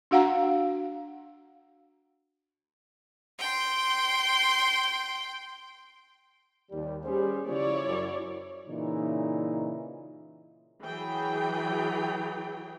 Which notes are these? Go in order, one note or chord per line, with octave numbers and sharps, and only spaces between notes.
D4 F#4 F5 F#5 A#5
G5 C6
D#2 G3
G3 C#4 G#4 C5
C#3 F3 E4 C#5 D5
F#2 F#3
A#2 C#3 E3 D#4 E4
E3 F#3 G#4 G5